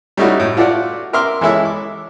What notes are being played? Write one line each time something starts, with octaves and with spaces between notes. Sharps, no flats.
G3 A3 C#4 D#4 E4 F#4
A2
F4 F#4 A4 D5 E5 F#5
A#4 E5 C6 D6 F6
E3 G#3 C#4 E4 A4 E5
D6